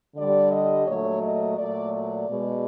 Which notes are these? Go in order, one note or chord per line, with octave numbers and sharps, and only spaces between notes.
D3 G3 D5
D#5
A#2 F#3 A3 C#5
D#5
A#2 F#3 A3 D5
D5
B2 G#3